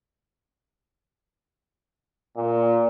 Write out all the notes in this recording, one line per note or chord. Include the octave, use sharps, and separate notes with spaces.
A#2